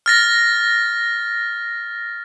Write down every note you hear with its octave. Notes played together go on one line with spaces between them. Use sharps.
F6 A6 A#6